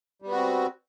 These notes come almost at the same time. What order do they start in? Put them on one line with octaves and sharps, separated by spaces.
G3 B3 F#4 C4